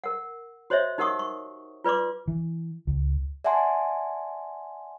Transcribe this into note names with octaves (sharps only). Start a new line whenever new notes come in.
A#4 F#5
F#4 C5 C#5 D#5 E5
D#4 G4 A#4 F#5 C#6 D#6
C#6
F4 B4 D5 C6 D6
E3
C#2
D5 E5 F#5 G#5 A5 C6